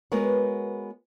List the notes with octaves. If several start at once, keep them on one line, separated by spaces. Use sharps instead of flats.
G#3 B3 F#4 A#4 B4 C#5